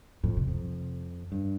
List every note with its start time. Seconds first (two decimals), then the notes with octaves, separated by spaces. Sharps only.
0.23 F2 A2
0.37 C3
0.47 F2 C3
0.64 C3
1.32 G2